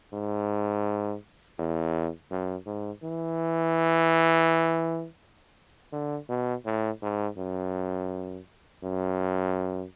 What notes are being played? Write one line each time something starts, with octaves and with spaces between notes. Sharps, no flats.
G#2
E2
F#2
G#2
E3
D3
B2
A2
G#2
F#2
F#2